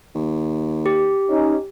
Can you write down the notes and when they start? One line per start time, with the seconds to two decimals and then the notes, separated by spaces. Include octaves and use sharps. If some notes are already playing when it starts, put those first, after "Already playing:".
0.15 D#2
0.86 G4
1.29 C#4 D#4